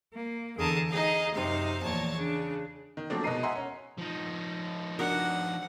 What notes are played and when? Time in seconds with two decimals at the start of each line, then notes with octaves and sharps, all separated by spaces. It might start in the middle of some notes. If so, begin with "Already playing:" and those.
0.13 A#3
0.57 E2 D3 G#4 A#4 A5 D#6
0.90 D#4 G#4 D#5 F5
1.35 F#2 C3 D#4 C5 F5
1.83 E2 A#2 F3 C#5 A5
2.17 C#3 D4
2.97 D#3
3.10 F3 F#3 A3 A#3 C4 D4
3.23 B2 G#3 D#4 A#4 C7 D#7
3.43 D#5 E5 F#5 G#5 A#5 C6
3.55 C#4
3.98 F3 D#4
4.99 D4 F#4 A#4 F#5